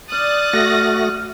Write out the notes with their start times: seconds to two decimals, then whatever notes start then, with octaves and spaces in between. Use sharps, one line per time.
0.12 D5 D#6 F6 F#6 A6
0.53 A3 F#4 A#6